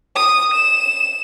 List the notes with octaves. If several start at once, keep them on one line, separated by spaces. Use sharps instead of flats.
D#6
E7